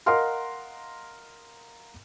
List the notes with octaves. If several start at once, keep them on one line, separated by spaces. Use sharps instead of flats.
A#4 D#5 F5 F#5 C6 F6